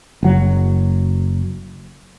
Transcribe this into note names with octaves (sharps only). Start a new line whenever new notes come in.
F#1 F#3